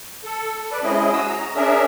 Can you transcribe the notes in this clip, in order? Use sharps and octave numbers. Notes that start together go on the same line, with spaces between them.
A4
B4 D5
G#3 C4 C#4 E4 G#4 D#5
F#4 G#4 D#6 E6
A#5
C#4 D4 G#4 A#4 E5